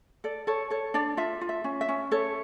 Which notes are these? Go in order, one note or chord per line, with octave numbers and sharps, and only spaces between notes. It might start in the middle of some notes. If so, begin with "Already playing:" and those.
A4 D5
A4 C#5
A4 C#5
D4 D5
F4 E5
F4
E5
C#4
E5
C#4
A4 C#5